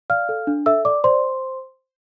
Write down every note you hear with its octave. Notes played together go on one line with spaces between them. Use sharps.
D5 F5 F6
A4
D4
A4 E5 E6
D5 D6
C5 D5 C6